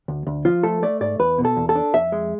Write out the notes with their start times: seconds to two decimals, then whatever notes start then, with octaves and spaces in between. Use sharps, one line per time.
0.08 D2
0.27 D2
0.45 F3 F4
0.63 A3 A4
0.83 A3 D5
1.01 G#2 D5
1.19 E2 B4
1.38 B2
1.45 A4
1.57 E2
1.69 A4
1.75 D4
1.94 F2 E5
2.12 G#3